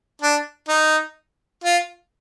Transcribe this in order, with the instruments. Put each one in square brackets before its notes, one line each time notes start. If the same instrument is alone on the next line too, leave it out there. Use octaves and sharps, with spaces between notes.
[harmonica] D4
D#4
F4